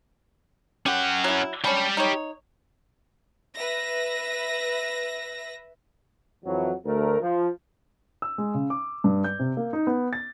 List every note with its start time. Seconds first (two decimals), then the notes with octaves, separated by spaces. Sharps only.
0.86 C#4 G4 F#5
1.24 F#3 E4
1.64 C#4 D4 G4 B5
1.97 D#4 C#5
3.55 B4 E5 A#6
6.45 F2 E3 F#3
6.86 D2 A3 A#4
7.21 F3
8.22 E6
8.38 G#3
8.54 C#3
8.70 D6
9.04 G2
9.24 G6
9.39 C3
9.57 A#3
9.73 D#4
9.87 B3
10.13 A6